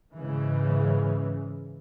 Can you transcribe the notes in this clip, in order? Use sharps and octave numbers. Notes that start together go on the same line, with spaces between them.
G#2 C#3 E3 G#3